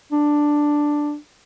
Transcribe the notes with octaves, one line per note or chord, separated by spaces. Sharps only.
D4